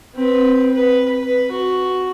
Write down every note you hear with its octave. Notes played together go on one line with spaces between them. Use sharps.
C4 B4
B4
B4
F#4